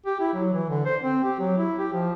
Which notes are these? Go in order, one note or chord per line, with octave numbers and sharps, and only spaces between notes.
G4
E4
F#3
E3
D3
C5
C4
G4
F#3
E4
G4
F3